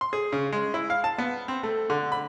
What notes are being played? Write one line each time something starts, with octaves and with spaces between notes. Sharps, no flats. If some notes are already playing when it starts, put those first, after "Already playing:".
C6
G#4
C#3
G#3
E4
F5
A5
B3
C4
A3
D3
B5